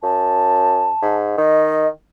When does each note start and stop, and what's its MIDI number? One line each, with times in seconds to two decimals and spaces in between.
0.03 0.91 42
0.03 1.16 81
1.02 1.36 44
1.38 1.89 51
1.38 1.87 75